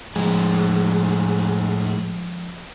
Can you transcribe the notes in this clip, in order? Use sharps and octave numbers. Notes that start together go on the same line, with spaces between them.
A2 F3 G#3 G#4